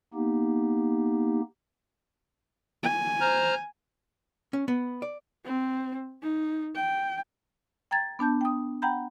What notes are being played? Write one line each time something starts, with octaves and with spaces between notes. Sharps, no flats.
A#3 B3 D#4 G4
G#5
C5 A#5 F6
C#4
B3
D5
C4
D#4
G5
G5 A#5 G#6 A6
B3 D4 A5 G6
G5 D#6
F#5 G5 A#5 B5 G6